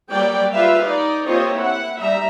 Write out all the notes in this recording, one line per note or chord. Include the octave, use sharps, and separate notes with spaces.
F#3 G3 A#3 D5 G5
F4 G4 B4 E5 F5
D#4 D5
A#3 C4 F4 G4 C#5 D#5
E4 F#5
G3 D#4 E5 A#5